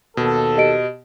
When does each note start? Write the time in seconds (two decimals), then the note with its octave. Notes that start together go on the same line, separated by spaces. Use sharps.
0.17 D#2 B2 A4
0.57 G4 D#5 D7